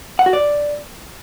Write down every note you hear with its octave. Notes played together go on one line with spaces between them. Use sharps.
F#5
F#4
D5